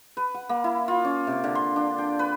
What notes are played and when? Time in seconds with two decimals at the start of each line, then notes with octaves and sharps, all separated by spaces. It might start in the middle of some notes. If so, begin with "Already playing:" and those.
0.17 B4
0.34 F#5
0.49 A#3
0.64 E4
0.88 F4
1.05 C#4
1.27 C3
1.44 D3
1.55 C6
1.76 D4
1.98 G5
2.19 B4